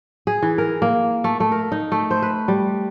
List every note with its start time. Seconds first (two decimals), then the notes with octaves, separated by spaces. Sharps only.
0.27 G#4
0.42 E3
0.58 A#4
0.82 A#3
1.24 A3
1.40 A3
1.52 A#4
1.72 D#4
1.92 A3
2.11 C5
2.22 B4
2.48 G3